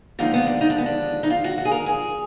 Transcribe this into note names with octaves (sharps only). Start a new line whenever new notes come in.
D#2 D3 F3 G#3 D#4
B3
D4
D#4
D4
B3
D4
D#4
F4
F#4
F#4
G#4
A#4
G#4